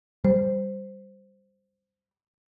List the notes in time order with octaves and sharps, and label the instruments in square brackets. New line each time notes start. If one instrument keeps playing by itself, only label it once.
[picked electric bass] G3 [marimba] C5